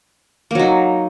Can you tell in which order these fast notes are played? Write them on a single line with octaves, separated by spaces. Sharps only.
A#3 F#3 D#4